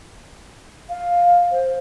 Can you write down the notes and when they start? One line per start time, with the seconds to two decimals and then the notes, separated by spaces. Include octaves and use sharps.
0.89 F5
1.51 C5